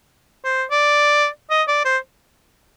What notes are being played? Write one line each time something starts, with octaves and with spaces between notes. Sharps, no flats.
C5
D5
D#5
D5
C5